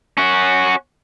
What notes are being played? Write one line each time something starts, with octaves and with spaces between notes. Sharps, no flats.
C#4 F#4